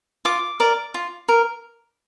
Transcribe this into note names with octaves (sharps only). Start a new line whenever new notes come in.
F4 D6
A#4 D5
F4
A#4